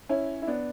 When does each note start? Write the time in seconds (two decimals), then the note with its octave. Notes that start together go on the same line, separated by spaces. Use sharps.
0.09 C#4 E4
0.42 E4
0.47 B3 D4